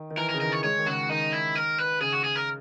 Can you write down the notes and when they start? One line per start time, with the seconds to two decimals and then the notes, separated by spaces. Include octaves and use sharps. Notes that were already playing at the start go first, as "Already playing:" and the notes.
Already playing: D#3
0.10 D#3
0.17 E3 A#4
0.29 A#4
0.34 C#3
0.41 D#3 A#4
0.52 C#5
0.64 G#3 C#5
0.79 D#3
0.86 C#3 F#4
1.09 D#3 D#4
1.33 E4
1.55 A#4
1.79 B4
2.01 C#3 G#4
2.13 F#4
2.24 G#4
2.36 A#4